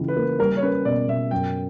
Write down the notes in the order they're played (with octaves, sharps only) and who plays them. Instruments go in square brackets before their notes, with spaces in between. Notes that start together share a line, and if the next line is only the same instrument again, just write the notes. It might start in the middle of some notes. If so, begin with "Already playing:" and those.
Already playing: [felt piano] C#2 C#3 E3
[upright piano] B4
[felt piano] A#3
[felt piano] G3 [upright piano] A#4
[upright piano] C#5
[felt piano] C#4 [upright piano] B4
[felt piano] B2 [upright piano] D5
[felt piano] B2 [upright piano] E5
[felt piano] F#2 [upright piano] G5